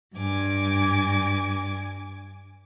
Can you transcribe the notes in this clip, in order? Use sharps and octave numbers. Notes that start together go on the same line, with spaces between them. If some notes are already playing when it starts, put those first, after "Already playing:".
G2 G#5 D6